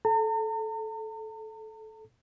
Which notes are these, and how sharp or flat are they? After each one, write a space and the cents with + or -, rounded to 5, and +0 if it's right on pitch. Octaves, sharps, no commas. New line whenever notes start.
A4 -20 A#5 -45